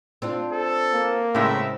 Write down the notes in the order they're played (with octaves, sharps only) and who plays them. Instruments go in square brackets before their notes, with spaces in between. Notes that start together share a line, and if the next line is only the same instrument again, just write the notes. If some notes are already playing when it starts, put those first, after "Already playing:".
[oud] C4 D4 F4
[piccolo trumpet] A4
[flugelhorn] A#3
[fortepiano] A2 C#3 G#3 [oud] C4 C#4 [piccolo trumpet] E5